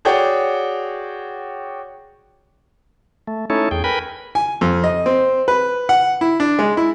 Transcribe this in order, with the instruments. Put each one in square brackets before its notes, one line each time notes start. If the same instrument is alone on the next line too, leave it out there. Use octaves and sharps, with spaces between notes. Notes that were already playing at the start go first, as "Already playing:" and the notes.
[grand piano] F#4 G#4 C#5 D5 F#5 G5
[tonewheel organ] A3
A3 C#4 D#4 E4 A4 C#5
E2 G#4 G5
A#4 B4 G5 G#5 B5
[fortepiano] G#5
F2
D#5
C4
B4
F#5
E4
D4
G#3
E4